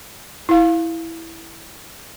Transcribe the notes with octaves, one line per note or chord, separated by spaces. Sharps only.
E4 F5